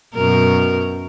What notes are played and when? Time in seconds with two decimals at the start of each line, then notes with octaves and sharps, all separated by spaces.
0.14 F#2 B2 A#4